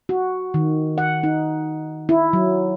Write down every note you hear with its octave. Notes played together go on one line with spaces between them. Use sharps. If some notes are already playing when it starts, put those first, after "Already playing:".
F#4
D#3
F#5
D#4
E4
F#3